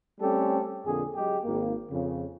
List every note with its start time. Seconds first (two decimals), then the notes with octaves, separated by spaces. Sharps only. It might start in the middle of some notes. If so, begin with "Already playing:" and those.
0.20 G3 A3 C4 C#4 G4 A4
0.85 F2 A#2 D3 G#4
1.15 F#2 G#3 G4
1.44 G#1 A#3
1.91 F2 C#3